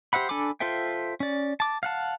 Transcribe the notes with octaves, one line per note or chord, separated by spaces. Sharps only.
G4 C5 E5 F#5 B5
D4 A4 G#5 B5 D6
F4 A4 C5 E5 G5
C#4 D5
A5 D6
F5 F#5 A5